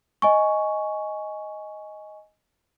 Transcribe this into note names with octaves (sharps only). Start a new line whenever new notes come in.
D#5 G#5 C#6